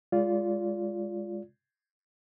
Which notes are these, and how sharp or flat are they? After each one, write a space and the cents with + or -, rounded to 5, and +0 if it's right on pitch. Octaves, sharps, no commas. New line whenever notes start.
G#3 -20 F4 +0 D5 -30